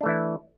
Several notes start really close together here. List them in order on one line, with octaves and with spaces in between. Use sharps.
D4 A3 E3 E4